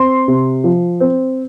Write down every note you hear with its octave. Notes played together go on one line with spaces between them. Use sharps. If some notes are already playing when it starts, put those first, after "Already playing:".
Already playing: C4 C6
C3
F3
C4